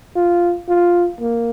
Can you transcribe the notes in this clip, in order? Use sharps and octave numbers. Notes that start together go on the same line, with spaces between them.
F4
F4
A#3